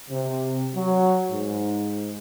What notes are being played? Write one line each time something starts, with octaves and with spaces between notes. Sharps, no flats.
C3
F#3
G#2